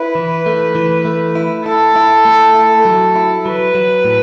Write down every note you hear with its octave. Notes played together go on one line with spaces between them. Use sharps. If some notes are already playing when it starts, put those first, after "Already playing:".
Already playing: E4 B4
E3
A3
E3
A3
E4
E4 A4
E4
A3
E4
F#3
E4
F#3 B4
F#3
A2